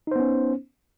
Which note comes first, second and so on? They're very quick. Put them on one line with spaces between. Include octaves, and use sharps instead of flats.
D#4 C5 B3 C#4